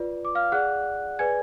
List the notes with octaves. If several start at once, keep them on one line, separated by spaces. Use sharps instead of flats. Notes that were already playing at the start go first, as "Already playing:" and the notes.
Already playing: F4 B4 D5
D6
F5 F6
G#4 D5 F#5 F#6
G#4 B4 D5 G#5 G#6